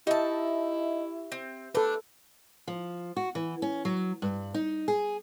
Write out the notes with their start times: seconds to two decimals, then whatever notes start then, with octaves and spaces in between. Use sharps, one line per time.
0.07 D#4 E4 G4 E5 A5
1.32 C4
1.75 A3 D4 A4 B4
2.67 F3
3.16 F#4
3.35 E3
3.62 C#4
3.85 F#3
4.22 G2
4.54 D#4
4.88 G#4